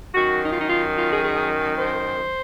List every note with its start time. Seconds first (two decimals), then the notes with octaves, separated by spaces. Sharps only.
0.15 F#2 D#3 F#4
0.42 D#4
0.50 F4
0.58 D#4
0.68 F4
0.96 F4
1.09 G#4
1.23 G#4
1.76 C5